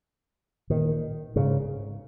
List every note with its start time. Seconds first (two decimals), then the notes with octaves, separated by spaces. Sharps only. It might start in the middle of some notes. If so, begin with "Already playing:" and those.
0.70 A#2 D#3
1.36 G#2 C#3